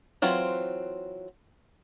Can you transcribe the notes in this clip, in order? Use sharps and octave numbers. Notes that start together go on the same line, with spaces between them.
E3 F#3 C4 F4